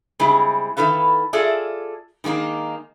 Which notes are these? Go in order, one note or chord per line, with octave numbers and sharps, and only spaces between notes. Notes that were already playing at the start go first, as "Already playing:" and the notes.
C#3 G3 G#3 C4 E4
D#3 E4 A4 B4 F5
F4 G#4 A4 D5 E5
D#3 G#3 A#3 D#4